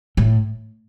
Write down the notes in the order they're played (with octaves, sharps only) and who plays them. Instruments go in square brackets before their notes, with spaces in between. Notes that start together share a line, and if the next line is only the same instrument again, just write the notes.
[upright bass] A2